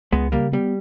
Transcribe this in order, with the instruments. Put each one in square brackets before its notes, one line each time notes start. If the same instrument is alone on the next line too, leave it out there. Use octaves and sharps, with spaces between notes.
[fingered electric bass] C#2 [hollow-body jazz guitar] G#3 B3
[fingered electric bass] C#3 [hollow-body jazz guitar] G3 A#3
[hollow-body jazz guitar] G3 [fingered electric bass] B3